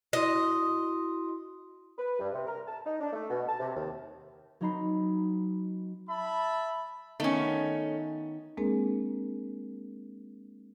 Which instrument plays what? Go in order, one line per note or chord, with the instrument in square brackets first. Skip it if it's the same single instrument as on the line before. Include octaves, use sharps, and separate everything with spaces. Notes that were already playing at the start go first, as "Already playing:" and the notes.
[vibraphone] E4 F#4 C6 [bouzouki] D#5
[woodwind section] B4
G2
C3
A#4
A5
D#4
D4
A3
B2
A5
C3
D#2
[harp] F#3 C4 D#4 A#5 B5 C7
[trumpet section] E5 A5 B5
[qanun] D#3 B3 D#4 [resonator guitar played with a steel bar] A3 C#4
[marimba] G#3 A#3 C4 D4 G#4 A#4